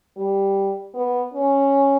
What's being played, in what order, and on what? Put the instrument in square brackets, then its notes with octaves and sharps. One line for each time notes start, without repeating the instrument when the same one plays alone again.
[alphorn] G3
B3
C#4